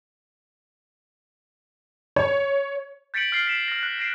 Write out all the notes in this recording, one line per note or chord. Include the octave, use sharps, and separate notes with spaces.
C#5
G6 A6 B6 C#7 D7 F#7
F6 A6 C7
B6 D7 E7
F6 A#6
F#6
F#6 A#6 C7 D7 E7